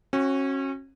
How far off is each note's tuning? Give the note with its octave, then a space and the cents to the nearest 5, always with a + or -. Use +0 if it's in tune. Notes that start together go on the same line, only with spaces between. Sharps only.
C#4 -30 F#4 +0